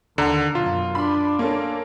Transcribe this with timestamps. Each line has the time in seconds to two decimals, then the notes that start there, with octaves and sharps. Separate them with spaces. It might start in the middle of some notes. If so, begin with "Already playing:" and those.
0.18 D#2 D3 F#5 A#5 C#7
0.55 F#2 B2 F4
0.95 D4 B5 C6
1.39 A#3 C#4 A4